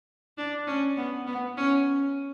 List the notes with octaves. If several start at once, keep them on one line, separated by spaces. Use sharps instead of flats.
D4
C#4
B3
B3
C#4